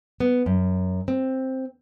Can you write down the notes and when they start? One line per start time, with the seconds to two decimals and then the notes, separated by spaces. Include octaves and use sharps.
0.20 B3
0.46 F#2
1.08 C4